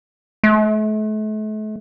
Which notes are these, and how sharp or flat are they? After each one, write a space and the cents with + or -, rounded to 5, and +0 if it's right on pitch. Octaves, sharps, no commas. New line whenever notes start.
A3 -40